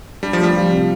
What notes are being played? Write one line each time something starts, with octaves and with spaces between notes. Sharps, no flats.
G3 D4
F3
G3 A3
F3
C3